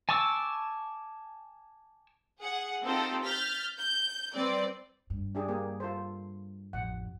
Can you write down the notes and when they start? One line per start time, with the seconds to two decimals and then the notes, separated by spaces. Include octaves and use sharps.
0.09 G#5 A5 C#6 D6 E6
2.40 G#4 F#5
2.82 C4 D#4 F4 G4 A4 C5
3.24 F6 G6 A6 B6
3.77 G6
4.34 G3 C4 B4 D5
5.10 G2
5.35 D4 G4 G#4
5.48 A#3 G4 G#4
5.80 F4 A4 C5
6.73 A1 F2 F#5